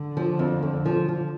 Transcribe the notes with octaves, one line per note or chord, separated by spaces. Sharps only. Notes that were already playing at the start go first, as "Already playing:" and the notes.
Already playing: D3
F3
F2
F2
F3
F3